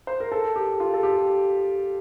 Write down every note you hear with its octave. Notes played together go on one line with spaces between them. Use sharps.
C5
A#4
A4
G4
F4
A4
G4